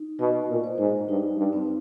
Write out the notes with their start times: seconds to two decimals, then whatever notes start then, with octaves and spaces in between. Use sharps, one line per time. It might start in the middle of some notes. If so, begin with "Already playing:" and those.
Already playing: D#4
0.19 B2 D#5
0.49 A#2
0.64 C5
0.78 G#2
1.08 G2 D#4
1.37 G2
1.53 C4